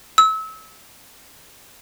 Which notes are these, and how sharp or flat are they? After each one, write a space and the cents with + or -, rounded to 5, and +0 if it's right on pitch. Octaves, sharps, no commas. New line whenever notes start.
E6 -30